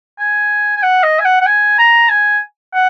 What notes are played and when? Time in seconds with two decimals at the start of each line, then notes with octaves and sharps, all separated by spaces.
0.19 G#5
0.76 G#5
0.83 F#5
1.03 D#5
1.20 G#5
1.25 F#5
1.41 F#5
1.46 G#5
1.79 A#5
2.09 G#5
2.74 F#5